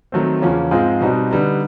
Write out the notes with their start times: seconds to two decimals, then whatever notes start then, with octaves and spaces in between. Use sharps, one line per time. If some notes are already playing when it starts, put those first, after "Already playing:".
0.12 D#3 F#3 A3 C4
0.42 E2 C#3 F3 A#3 C#4
0.71 G#2 F3 G#3 C4 F4
1.01 B2 G3 C4 D#4 F#4
1.31 D3 G3 B3 D#4